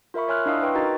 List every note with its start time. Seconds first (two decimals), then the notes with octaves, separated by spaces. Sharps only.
0.14 F4 A#4 E5 B5 C#6
0.28 C#5 E5 G#5 C6 F6 F#6
0.46 D4 E4 D#5 F5 D#6 E6
0.62 B4 G5 C6 C#6
0.75 D#4 F#4 A#4 D#5 A#5 A6